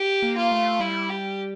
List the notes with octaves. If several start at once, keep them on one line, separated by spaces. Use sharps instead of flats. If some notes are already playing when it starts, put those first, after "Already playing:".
Already playing: G4
A#3
F4
A3
G3 E4
G4